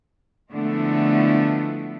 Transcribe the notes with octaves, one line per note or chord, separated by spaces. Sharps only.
D3 F3 G#3 A3 B3 E4